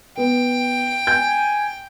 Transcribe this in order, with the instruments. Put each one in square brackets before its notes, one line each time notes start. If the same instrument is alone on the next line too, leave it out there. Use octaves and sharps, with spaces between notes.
[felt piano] B3 [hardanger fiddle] G5
[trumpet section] G#5 [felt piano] G6